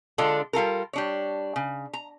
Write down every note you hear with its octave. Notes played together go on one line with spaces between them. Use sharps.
D3 G#3 D4 F4 A4
G3 F4 A4 A#4
G3 D4 C#5
C#3
A#5